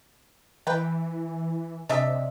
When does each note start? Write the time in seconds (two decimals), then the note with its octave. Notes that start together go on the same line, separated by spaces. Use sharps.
0.67 E3 B4 G5
1.89 C3 D4 D#5 E5